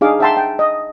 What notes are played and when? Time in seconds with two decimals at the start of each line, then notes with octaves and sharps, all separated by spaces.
0.01 D4 D#4 G#4 F5 D6
0.20 E5 F#5 G5 A5 A#5 C6
0.37 G5
0.59 D#5